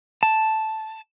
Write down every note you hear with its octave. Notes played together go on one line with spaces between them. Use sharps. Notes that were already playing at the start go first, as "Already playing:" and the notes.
A5